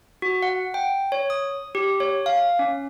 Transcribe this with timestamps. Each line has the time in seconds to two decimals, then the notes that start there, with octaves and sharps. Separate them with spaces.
0.22 F#4
0.42 F#5
0.74 G5
1.12 C#5
1.30 D#6
1.75 G4
2.00 C#5
2.26 F5
2.59 C#4